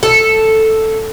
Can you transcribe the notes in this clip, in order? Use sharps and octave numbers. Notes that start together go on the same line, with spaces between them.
A4